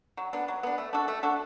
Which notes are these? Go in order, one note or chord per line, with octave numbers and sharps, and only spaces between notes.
F#3
B3 D4
F#3
B3 D4
A3
D4 F#4 A4
A3
D4 F#4 A4